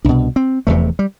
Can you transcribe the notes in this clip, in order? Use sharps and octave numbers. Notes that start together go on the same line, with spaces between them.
C2 B2 D4
C4
F1 E2 C3 A3
G3